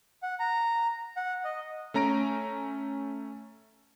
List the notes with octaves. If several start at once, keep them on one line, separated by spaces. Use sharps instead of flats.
F#5
A#5
F#5
D#5
A3 C#4 A#5 A#6 D7